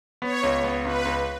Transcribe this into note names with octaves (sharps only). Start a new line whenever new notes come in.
B3 C#5
C#2
B3
C#2 B4
C#2